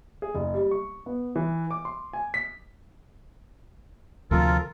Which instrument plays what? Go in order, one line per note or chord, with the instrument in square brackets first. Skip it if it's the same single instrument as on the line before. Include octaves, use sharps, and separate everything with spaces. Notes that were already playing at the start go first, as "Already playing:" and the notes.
[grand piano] G#4
F#1
G3
C#6
B3
E3
D6
C6
G#5
B6
[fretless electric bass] D2 C3 F3 [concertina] F4 A4 A#4